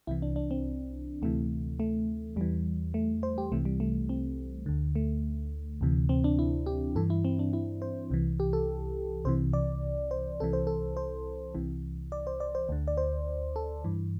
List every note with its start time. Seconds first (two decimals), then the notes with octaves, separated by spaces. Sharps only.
0.07 C2 C3 E3 E4
0.22 D4
0.36 D4
0.51 C4
1.22 D2 C3 E3 A3
1.80 A3
2.36 E2 E3 G3
2.94 A3
3.23 C5
3.38 G4
3.52 C2 C3 E3 A3
3.65 G3
3.80 A3
4.09 C4
4.66 D2 D3
4.95 A3
5.81 D2 C3 E3
6.09 C4
6.24 D4
6.39 E4
6.66 G4
6.95 G2 E3 A4
7.10 E4
7.24 C4
7.39 D4
7.53 E4
7.82 C5
8.10 C2 C3 E3
8.40 G4
8.53 A4
9.25 C2 C3 E3 C5
9.53 D5
10.11 C5
10.40 C2 C3 E3 A4
10.53 C5
10.67 A4
10.97 C5
11.55 C2 C3 E3
12.12 D5
12.27 C5
12.40 D5
12.55 C5
12.69 D2 D3
12.88 D5
12.97 C5
13.56 A4
13.84 G2 E3